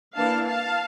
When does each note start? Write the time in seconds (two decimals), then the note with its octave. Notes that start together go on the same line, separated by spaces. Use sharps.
0.16 E3 A#3 D4 F5 A5
0.47 F5 A5